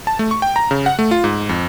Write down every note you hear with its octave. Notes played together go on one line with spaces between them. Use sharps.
A5
A3
C#6
G5
A#5
C#3
F#5
A3
F4
G#2
F2